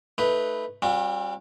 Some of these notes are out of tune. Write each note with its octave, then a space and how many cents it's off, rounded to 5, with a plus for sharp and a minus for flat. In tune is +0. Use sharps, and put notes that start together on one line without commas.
A3 +5 D#4 +20 B4 +0
G3 +0 C#4 -45 F#4 -40